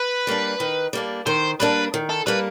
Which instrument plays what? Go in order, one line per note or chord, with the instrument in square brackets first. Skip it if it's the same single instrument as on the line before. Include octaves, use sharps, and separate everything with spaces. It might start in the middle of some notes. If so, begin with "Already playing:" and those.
Already playing: [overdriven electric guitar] B4
[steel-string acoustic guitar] G3 A#3 D4
D#3
G3 A#3 D4
[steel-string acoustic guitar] D#3 [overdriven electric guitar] C5
[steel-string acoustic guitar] G3 A#3 D4 [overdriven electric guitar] B4
[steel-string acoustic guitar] D#3
[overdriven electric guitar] A4
[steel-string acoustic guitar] G3 A#3 D4 [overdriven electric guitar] B4